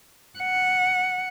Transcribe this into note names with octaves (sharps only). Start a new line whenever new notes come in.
F#5